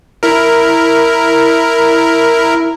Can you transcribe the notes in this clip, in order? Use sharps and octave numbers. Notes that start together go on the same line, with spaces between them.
E4 A#4